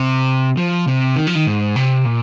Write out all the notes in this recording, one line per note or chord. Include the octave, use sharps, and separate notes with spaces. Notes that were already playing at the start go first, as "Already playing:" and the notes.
Already playing: C3
F3
C3
D#3
F3
D#3
G#2
C3
A#2